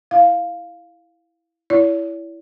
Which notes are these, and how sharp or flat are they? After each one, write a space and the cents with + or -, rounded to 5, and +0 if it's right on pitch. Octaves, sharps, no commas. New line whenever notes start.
E4 +0 F5 +0
E4 +10 C#5 +45